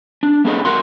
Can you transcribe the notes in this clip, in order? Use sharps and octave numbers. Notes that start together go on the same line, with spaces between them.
D4
A#3 B3 C#4 D#4 G#4 A4
F#4 A#4 F#5 C6